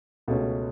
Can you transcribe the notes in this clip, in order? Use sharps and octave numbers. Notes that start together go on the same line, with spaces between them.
C#2 B2 A3 C#4